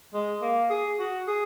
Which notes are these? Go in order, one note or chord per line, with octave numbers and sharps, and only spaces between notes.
G#3
A#3
G#4
F#4
G#4